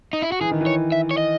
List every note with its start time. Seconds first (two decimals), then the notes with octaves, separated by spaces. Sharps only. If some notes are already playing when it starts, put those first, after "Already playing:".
0.13 D#4
0.22 E4
0.32 F#4
0.41 E3 G#4
0.51 D#3
0.61 E3
0.66 C#5
0.92 E5
1.11 C#5
1.18 D#5